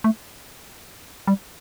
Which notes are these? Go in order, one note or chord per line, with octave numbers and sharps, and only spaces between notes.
A3
G3